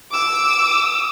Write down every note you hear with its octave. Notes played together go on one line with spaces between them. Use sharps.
D6 E6